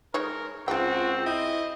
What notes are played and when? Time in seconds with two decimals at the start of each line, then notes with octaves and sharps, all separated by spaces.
0.14 G#3 D#4 A#4 C#5
0.68 C#2 C4 F4 F#4 G5
1.26 E4 D#5